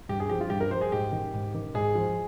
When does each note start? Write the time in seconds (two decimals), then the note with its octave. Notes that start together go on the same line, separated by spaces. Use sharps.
0.09 G2 G4
0.20 G#4
0.29 F3 G4
0.41 F4
0.50 G2 G4
0.60 A#4
0.71 F3 C5
0.81 G#4
0.92 G#2 G4
1.12 D#3
1.33 G#2
1.54 D#3
1.74 G#2 G#4
1.95 F3